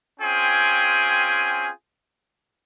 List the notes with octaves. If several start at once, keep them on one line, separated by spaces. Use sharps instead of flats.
C4 C#4 F4 G#4 G5 G#5